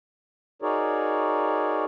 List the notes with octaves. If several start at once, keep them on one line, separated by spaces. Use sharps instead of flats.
D#4 F#4 G#4 A#4 C#5 D5